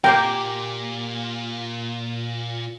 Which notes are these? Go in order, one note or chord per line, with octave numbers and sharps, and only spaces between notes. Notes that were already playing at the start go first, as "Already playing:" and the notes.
A#2 A#3 G4 A#4 G5